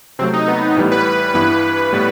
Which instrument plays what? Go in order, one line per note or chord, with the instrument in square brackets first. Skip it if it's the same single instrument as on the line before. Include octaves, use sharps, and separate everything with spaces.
[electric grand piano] C3 F#3 A3 [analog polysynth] C4
[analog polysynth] D#4
B3
[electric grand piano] A2 E3 G3 B3
[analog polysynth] B4
[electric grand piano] G2 E3 B3 E4 [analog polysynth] B4
[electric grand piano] A2 G3 B3